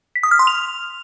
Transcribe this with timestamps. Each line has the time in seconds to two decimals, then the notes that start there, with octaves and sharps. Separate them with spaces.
0.16 B6
0.23 D#6
0.31 F6
0.39 C6
0.47 F7